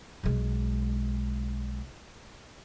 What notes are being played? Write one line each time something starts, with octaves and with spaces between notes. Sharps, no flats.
B1 G#3